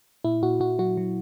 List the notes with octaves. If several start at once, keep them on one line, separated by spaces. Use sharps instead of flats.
A#2 E4
A#2 F#4
A#2 F#4
F#3 F#4
F#3